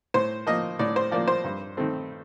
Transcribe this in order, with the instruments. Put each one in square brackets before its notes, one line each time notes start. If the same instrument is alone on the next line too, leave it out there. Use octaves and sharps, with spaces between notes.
[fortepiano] A2 C5
F3 A#3 D#5
A2 D5
C5
F3 A#3 D5
C5
G2
D#3 A3 C4